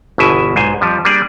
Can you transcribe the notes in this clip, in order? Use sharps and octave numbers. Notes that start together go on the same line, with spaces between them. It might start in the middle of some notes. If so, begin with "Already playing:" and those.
G1 E2 B2 E4 E5 G#5
B1 G#2 C5 G#5
F2 F3 G3
G3 A#3 D4 G#4 D5